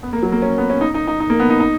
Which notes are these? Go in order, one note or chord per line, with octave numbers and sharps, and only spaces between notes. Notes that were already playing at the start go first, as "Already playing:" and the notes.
B3
A#3
F#3
A#3
C#4
B3
C#4
D#4
D#4
D#4
D#4
A#3
B3
D#4
D#4